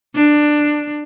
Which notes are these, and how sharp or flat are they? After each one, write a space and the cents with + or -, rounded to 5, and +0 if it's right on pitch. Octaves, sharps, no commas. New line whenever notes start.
D4 +15